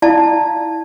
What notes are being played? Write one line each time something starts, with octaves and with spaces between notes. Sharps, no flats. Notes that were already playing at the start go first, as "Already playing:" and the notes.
E4 D5 F5 A5